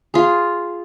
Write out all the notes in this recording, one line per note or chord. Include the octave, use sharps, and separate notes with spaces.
F4 G#4